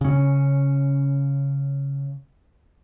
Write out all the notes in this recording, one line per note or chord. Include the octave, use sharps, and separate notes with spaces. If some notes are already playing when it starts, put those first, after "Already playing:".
C#3 C#4